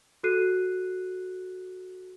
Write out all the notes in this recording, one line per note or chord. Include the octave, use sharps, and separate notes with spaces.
F#4 A4 F#6 C7 D#7